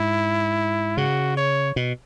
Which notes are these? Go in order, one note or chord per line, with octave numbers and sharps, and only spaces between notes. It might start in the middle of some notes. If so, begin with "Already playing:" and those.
Already playing: G#2 E4
C#3 F#4
C#5
B2